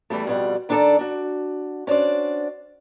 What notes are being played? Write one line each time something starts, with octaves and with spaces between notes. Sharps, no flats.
E2 E3 G3 A3
F2 B2 G3 F#5
D#3 D4 G#4 A4 D5 A#5
D4 F#4
C#4 D4 F#4 C5 D5